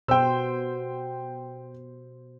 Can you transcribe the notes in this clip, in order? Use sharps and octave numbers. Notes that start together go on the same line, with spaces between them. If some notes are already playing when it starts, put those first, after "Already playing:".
B2 C5 G5 E6